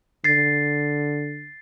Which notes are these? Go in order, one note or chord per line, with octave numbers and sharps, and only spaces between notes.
D3 A6 C7